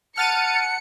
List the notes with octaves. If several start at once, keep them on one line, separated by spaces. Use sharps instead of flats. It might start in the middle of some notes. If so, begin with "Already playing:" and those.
F#5 A5 F6 A6 C#7 D#7